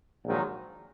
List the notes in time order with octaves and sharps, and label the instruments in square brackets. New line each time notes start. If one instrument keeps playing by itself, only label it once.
[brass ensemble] A#1 G#2 D#3 F#3